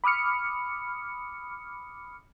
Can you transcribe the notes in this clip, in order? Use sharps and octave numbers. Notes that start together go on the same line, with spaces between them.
B5 D6 D#6 F6 C#7